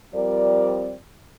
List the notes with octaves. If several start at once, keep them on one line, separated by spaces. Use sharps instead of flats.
F3 G3 C4 A#4 D5